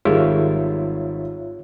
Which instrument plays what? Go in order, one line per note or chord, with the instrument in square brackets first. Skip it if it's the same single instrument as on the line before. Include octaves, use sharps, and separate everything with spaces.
[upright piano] G#1 G3 [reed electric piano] F4 C#5 E5 [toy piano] G#4